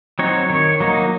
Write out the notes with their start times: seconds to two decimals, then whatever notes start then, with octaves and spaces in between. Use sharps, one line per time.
0.19 F#3 C4 D#4 C#5
0.50 D#3 C#5
0.80 F#3 A#3 D#4